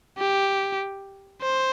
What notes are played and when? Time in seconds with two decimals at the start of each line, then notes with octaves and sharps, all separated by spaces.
0.18 G4
1.42 C5